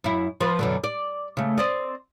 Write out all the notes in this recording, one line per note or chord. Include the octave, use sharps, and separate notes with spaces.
F#2 E4
F3 B4
F#2 B2 D3
D5
C#3 A3
C4 D5 D#5